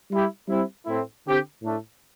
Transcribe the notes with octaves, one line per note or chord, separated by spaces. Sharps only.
G3 E4 G4
G3 C4 E4
A2 A3 C4 E4
D3 C4 G4
A2 A3 D4